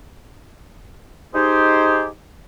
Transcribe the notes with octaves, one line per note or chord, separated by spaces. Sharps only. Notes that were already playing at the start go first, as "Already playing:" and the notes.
D#4 G4 G#4 C5